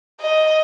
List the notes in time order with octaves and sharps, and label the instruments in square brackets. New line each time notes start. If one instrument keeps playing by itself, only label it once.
[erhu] D#5